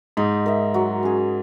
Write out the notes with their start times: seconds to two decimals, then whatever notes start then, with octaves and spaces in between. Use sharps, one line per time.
0.17 G#2 D#4
0.46 A#4 E5
0.74 F#3
1.03 C#4 G#4